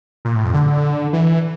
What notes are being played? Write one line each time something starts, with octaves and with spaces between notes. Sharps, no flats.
A#2
A2
F2
D3
E3